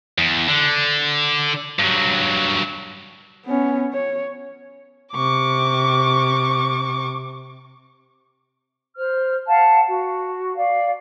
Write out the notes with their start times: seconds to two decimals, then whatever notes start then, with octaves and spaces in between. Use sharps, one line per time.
0.18 E2
0.48 D3
1.79 G2 F#3
3.46 B3 C#4
3.93 C#5
5.12 C3 C#6 D6
8.95 C5 F6
9.46 F5 F#5 A5
9.85 F#4
10.55 D5 F5